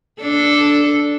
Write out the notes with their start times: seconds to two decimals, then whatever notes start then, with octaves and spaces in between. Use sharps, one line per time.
0.22 D4 A4